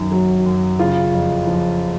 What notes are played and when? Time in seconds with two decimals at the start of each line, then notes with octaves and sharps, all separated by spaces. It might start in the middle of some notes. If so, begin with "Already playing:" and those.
Already playing: F#2 D#3
0.12 F#3
0.46 F#2
0.79 C#3 F4
1.14 F2
1.47 F3